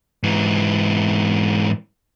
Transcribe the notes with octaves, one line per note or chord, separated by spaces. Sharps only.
G#2 E3